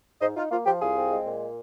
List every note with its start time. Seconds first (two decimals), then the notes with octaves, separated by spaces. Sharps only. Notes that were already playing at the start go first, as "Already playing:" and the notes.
0.21 G#2 C5 D#5
0.37 D#4 F4
0.51 A#3 F4
0.66 F3 G4
0.81 C2 F4 G#4
0.96 C4
1.11 G#3
1.26 A#2